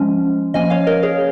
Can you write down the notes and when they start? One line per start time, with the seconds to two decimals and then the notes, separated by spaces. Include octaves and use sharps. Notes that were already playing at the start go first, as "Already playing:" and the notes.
Already playing: F3 G#3 C#4
0.54 F3 A#3 C#4 D#5 G#5
0.70 C#5 F5
0.87 A#4 D#5
1.03 G#4 C#5